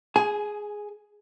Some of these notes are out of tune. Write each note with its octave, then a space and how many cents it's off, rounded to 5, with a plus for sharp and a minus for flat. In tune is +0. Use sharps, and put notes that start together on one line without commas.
G#4 +0 G#5 +30